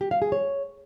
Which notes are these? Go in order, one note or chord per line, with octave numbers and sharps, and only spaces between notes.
G4
F5
G#4
C#5